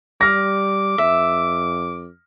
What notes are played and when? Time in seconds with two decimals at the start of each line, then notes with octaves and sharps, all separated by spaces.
0.21 G3 D6 F6 A#6
0.98 F2 E5